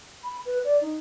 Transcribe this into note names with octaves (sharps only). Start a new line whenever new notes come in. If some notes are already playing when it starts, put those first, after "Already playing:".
B5
B4
D5
D#4